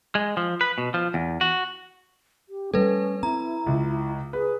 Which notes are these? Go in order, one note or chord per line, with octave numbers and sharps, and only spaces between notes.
G#3
F3
B4
B2
F3
E2
F#4
G4
G3 A3 C#4 A4 B4
C4 E4 A#5
C#2 C#3
G#4 B4